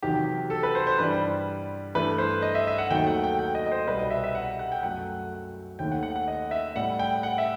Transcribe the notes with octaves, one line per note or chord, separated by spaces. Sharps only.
E2 C3 D#3 F#3 G4
A4
B4
C5
C5
G2 E3 G3 B4
G2 E3 A3 B4
C5
D#5
E5
E5
F#5
D#2 D#3 F#3 A3 G5
F#5
G5
G5
D#5
D#5
C5
C2 B2 G3 B4
D#5
E5
E5
F#5
F#5
G5
F#2 F#3 A3 F#5
D#2 D#3 A3 G5
F#5
F#5
F#5
D#5
E5
A2 G3 F#5
G5
F#5
E5